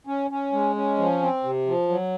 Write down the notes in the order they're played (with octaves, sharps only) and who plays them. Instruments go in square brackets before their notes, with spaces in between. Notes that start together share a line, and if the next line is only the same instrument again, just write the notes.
[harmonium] C#4
C#4
G#3
C#4
F3
C4
C3
F3
F#3